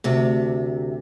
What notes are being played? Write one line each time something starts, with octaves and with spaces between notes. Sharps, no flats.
D2 C3